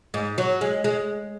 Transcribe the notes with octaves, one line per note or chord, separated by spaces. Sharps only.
G#2
F#3
G#3
G#3